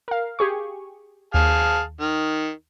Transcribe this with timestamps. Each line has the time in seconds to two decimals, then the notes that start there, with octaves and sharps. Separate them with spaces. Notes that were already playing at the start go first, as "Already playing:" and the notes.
0.08 A#4 F5
0.39 G4 G#4 C#6
1.34 D#2 G#4 F5 A5
2.00 D#3